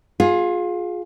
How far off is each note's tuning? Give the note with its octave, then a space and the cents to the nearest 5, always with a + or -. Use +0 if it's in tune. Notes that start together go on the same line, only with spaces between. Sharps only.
F4 +25 G#4 +5